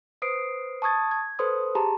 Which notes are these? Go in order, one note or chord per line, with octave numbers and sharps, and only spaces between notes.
B4 C5 D#6 C7 D7
A5 C#6 D#6 G#6 A6
G#6
A4 B4 C5 C6 D#6
G4 G#4 A5 A#5 C6